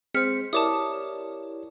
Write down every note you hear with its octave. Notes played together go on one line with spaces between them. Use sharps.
G#3 C4 C5 F6 B6 C#7
E4 G4 A#4 C#5 D5 A5 D6 D#6